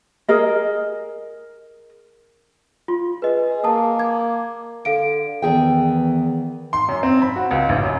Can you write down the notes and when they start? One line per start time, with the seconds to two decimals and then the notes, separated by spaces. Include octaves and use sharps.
0.28 G#4 A#4 D#5
2.88 F4 C6
3.22 G#4 B4 D#5
3.64 A#3 A5 D#6
3.99 D6 G#6
4.85 D3 A4 F5 D7
5.42 E2 D#3 E3 B3 G#4 G5
6.73 C6
6.89 F#2
7.03 C4
7.22 B5
7.36 F#4
7.51 C#2
7.69 A1
7.83 F#2